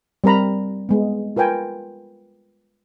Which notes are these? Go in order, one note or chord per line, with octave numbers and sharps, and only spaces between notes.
G3 C4 A#4 A#5 B5
G#3 B3
F4 A#4 B4 G5 G#5